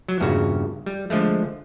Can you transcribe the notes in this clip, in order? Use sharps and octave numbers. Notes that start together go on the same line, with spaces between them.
F#3
E2 G2 A#2 C#3 F#4
G3
D3 F3 G#3 A3